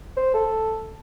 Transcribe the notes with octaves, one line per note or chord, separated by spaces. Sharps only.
C5
A4